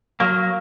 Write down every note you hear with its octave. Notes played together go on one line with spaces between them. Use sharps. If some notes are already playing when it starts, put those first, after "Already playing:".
F#3 A#3